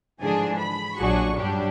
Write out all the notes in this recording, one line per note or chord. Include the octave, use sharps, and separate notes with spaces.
G#2 D3 E3 F3 D4 G#4
B5
A#1 F#3 D4 F#4 G#4 C#6
G2 F#3 G3 D4 G4